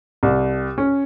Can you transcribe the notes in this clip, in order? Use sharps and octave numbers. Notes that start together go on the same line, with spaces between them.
C2
C#4